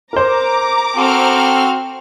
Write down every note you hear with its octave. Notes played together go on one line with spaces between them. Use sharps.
A#4 C5 A#5 D6
C4 F#4 A4 F6